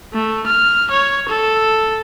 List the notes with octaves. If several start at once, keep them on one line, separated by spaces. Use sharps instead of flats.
A3
F6
C#5
A4